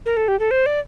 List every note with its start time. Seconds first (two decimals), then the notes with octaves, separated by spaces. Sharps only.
0.06 A#4
0.17 A4
0.28 G4
0.39 A4
0.51 C5
0.66 D5